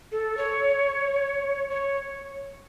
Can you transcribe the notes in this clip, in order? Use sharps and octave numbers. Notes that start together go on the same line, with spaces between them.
A4
C#5
C#5